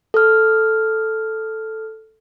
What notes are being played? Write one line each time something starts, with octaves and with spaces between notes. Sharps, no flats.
A4 F6